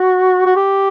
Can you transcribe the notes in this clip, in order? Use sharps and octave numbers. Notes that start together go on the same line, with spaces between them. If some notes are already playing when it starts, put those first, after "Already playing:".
Already playing: F#4
F#4
G4